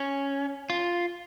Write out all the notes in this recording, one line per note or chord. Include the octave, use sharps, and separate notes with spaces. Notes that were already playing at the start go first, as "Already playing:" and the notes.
Already playing: C#4
F4